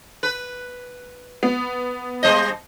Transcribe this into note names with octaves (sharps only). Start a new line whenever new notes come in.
B4
B3
G3 C5 D#5